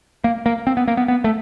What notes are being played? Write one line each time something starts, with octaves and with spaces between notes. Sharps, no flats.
A#3
A#3
C4
B3
A#3
B3
B3
A3